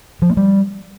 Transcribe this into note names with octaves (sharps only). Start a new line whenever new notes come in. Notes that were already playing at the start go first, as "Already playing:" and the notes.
F3
A#3
G3